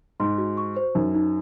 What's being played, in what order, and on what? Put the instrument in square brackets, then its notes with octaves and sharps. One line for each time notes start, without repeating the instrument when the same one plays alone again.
[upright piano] G#2 [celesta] C6
[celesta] F#4
C#6
C5
[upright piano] F#2 [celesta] D#4
[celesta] D#4